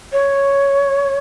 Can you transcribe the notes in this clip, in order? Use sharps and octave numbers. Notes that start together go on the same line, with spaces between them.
C#5